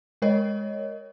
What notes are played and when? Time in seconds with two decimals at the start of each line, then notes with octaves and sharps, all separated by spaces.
0.22 G#3 A#4 C#5 D#5